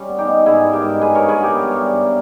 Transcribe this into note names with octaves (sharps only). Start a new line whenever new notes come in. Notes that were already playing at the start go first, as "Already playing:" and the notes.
Already playing: G3 C#4
B3
D#4 G4
B3
G#2 E4 G#4
G3
G4 A#4
G#2
G2 G#4 B4
G2 A#4 C#5
G#4 B4
B3 G4 A#4
G3
G3
G2